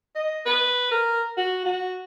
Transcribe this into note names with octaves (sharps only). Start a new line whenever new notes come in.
D#5
B4
A#4
F#4
F#4